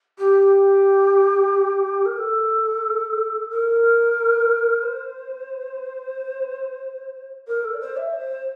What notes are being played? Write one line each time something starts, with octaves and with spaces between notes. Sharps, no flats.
G4
A#4
A4
A#4
C5
A#4
A4
D5
C5
E5
C5